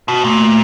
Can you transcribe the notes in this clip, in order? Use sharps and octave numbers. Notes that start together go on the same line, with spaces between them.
B2 F#4
A#2 A3
A3